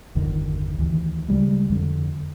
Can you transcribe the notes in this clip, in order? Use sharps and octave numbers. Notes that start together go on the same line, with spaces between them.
G1 E2 D3 D#3
D2 D#3 E3
C#3 G3 G#3
F2 D3